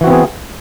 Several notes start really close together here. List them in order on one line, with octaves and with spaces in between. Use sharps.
E3 F#4 C4 B3 G#4